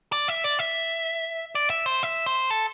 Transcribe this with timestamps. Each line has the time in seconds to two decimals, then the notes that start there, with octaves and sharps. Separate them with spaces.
0.12 D5
0.28 E5
0.44 D5
0.59 E5
1.55 D5
1.70 E5
1.86 C5
2.03 E5
2.26 C5
2.50 A4